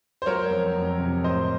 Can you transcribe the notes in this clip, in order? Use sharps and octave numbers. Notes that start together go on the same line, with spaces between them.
C5
F#3 A#4 C#5
F2
F2
C3
A2 C5 D#5